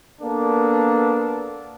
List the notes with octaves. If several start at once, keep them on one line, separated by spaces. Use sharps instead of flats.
A#3 B3 D4 A4